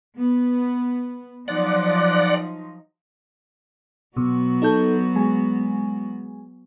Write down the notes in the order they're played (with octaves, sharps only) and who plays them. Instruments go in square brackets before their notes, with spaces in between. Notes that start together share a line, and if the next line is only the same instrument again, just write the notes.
[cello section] B3
[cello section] F3 F#3 D#4 [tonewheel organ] D5 F#5
[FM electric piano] B2 [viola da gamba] F#3 B3 F#4
[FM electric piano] D#4 A4 G6
G#3 G#5